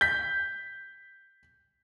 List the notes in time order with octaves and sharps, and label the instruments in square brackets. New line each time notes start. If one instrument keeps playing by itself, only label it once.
[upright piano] G6 B6